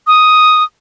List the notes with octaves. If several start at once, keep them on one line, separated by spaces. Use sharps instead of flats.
D#6